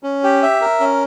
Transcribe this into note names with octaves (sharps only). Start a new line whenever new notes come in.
C#4
G4
E5
A#4
C#4